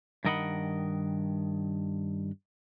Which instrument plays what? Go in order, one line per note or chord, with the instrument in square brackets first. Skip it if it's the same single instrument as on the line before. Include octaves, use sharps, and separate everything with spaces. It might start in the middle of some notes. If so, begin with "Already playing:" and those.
[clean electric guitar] G2 D#3 A#4 D#5 F#5 B5